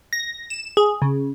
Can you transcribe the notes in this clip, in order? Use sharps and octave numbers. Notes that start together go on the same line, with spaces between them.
A#6
E7
G#4
C#3